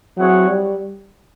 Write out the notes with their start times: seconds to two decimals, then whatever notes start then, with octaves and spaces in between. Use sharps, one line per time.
0.17 F#3 C4 E4 G#4 C#5 F#5
0.47 G3